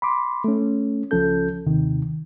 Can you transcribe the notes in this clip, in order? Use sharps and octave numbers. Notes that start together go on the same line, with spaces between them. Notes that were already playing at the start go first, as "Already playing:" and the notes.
B5 C6 D6
A3 C#4
C#2 F3 C#4 A4 G6
D#2 C3 D#3